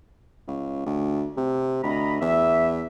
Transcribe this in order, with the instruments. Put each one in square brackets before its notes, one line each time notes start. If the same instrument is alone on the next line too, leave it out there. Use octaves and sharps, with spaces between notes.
[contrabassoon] C#2
D2
C3
[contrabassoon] D2 [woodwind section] D#5 A#5 B5
[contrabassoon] E2 [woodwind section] E5